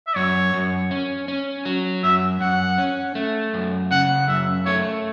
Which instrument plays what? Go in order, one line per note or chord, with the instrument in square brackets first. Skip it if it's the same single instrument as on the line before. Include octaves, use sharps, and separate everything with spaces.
[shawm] E5
[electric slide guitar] F#2 [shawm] C#5
[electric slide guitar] F#2
C#4
C#4
F#3
[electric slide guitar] F#2 [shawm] E5
[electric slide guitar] F#2 [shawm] F#5
[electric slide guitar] C#4
A3
F#2
[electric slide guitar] C#3 [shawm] F#5
[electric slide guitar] F#2 [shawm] E5
[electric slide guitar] A3 [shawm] C#5